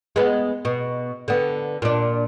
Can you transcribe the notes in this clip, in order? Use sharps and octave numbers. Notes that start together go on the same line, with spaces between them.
G#3 B3
B2
D3 B3
A#2 D4